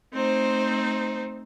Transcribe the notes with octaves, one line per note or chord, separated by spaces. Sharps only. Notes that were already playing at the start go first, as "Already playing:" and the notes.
A3 C4 D#4 C5